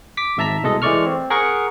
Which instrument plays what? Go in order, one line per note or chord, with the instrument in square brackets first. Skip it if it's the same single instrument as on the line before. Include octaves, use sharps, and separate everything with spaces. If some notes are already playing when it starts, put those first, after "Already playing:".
[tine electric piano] D6 B6
G#1 G#2 E5 A5 A#5 B6
C2 B2 G#3 A4 D#5
E3 G#3 A3 D5 C#6 F6
C4
G#4 A#4 F#5 C#6